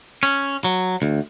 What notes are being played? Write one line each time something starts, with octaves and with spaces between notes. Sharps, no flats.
C#4
F#3
D2